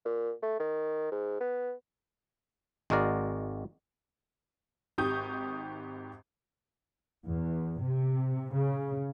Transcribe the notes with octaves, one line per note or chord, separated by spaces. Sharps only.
A#2
A3
D#3
G#2
B3
G#1 G#3 F#4 A#4 D5
G#1 D#4 G4 C#6 D#6 G6
E2
C3
C#3